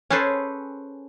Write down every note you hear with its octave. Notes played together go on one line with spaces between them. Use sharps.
C#4 G#4 A4 B4 C5